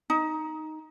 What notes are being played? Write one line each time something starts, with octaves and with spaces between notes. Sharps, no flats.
D#4